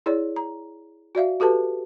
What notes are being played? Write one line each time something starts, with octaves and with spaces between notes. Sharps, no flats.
E4 G#4 C#5 D5
A#5
F#4 D5 E5 F5
F#4 G4 A4 B4 A5